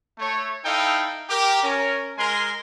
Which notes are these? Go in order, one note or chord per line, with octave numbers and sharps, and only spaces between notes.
A3 C#5
D#4 E4 A4 D#5 F5 G5
G4 A#4
C#4 A#4
G#3 A#4 G#5 A#5 C6